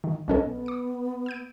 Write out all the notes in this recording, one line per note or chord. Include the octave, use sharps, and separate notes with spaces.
D#3
B1 C#4 A4 D#5
B3
D6 C#7
E6 G6 D7